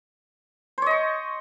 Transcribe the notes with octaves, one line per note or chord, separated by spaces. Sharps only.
C5 C#5 D#5 C#6